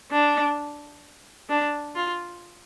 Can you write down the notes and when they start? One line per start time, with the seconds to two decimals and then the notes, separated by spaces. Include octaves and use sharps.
0.12 D4
1.50 D4
1.95 F4